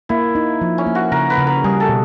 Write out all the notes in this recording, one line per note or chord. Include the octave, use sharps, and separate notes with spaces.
A#3 E4
D#4
F3
C#4
A#3
F#4
C#3 A#4
B4
C#3
A#4
G3 G#4
A4
B2